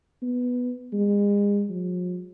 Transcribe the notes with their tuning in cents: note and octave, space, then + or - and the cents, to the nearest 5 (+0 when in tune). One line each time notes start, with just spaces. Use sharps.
B3 +0
G#3 -35
F3 +45